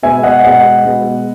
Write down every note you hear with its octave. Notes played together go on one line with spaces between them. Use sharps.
B2 G#3 B3 E5 G#5
D#5 F#5
B2 G#3 B3 D#5 F#5
B2 G#3 B3